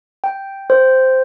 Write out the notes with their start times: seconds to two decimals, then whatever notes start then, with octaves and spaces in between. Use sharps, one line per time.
0.24 G5
0.70 C5